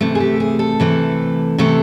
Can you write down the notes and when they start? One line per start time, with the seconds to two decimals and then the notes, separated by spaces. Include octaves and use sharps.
0.01 C3 E3 A3
0.15 G#4
0.20 G4
0.40 G#4
0.59 A4
0.80 C3 E3 A3
1.58 C3 E3 A3